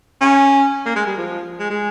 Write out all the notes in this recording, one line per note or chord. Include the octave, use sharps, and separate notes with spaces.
C#4
A#3
G#3
G3
F3
G#3
G#3